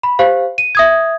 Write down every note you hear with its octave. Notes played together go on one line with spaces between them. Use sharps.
B5
G4 C5 F5
D#7
E5 D#6 G#6